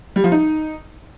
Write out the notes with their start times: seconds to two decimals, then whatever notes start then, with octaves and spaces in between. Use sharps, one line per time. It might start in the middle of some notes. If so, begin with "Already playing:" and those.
0.16 G3
0.24 F3
0.32 D#4